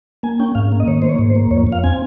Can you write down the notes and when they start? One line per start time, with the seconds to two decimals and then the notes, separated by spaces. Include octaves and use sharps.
0.23 A#3 G#5
0.40 C#4 G5
0.55 G#2 F5
0.72 A#3
0.80 D#5
0.87 D#3 C#5
1.02 A#3 C5
1.09 C#5
1.19 G#2
1.30 C5
1.35 A#3
1.51 F2 C#5
1.67 F2
1.72 F5
1.84 C4 G#5